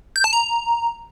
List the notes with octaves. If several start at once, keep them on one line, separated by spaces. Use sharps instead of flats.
G6
A5
A#5